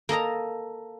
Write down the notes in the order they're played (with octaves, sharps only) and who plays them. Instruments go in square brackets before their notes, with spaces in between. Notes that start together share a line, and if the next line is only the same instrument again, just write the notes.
[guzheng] A#3 A4 D#5 A#5